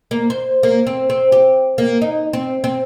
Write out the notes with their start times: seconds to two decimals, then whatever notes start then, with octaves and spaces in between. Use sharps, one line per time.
0.11 A#3
0.30 C5
0.63 A#3
0.87 C4
1.10 C4
1.32 G4
1.78 A#3
2.02 D#4
2.33 C4
2.64 C4